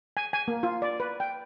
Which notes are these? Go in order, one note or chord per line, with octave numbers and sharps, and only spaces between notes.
G#5
G#5
A#3
F4
D5
B4
G5